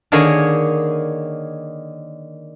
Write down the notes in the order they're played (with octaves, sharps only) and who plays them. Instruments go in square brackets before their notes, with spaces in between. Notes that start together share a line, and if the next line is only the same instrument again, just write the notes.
[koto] D3 D#3 A#3 G#4 C#5